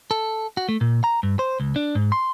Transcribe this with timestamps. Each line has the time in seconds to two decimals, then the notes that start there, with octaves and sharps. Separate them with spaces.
0.11 A4
0.57 F#4
0.69 A3
0.81 A#2
1.04 A#5
1.23 G2
1.39 C5
1.60 C#2
1.76 D4
1.95 G#2
2.12 C6